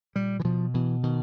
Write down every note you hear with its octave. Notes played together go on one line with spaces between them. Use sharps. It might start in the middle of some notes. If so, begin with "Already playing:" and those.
A#2 G3
E3
B2 F3
B2 E3
B2 D#3